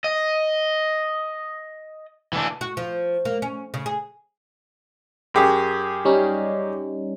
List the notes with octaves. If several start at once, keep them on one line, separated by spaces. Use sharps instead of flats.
D#5
E3 D4
F#4
F3
A#3
C#4
C#3
G#4
F#2 G4 G#4
G3 C#4 D#4